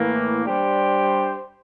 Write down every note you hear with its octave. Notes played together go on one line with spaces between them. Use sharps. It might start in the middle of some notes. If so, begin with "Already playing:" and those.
Already playing: A2 E3 A#3
G3 D4 G4 C5